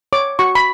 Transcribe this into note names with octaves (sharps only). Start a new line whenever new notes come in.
C#5 D6
F#4 C#6
B5